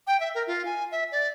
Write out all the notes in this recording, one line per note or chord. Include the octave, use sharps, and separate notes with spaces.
G5
E5
A#4
F4
G#5
E5
D5